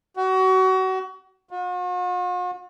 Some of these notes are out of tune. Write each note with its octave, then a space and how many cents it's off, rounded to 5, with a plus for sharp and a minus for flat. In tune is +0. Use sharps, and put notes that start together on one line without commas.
F#4 +30
F#4 -45